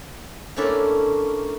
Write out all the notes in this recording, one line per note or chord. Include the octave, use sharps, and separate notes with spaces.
A3 A#3 C#4 D4 E4 A4